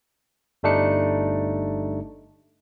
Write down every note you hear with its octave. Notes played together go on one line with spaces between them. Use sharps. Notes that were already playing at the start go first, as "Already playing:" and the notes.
G1 G3 A3 D4 D#4 C#7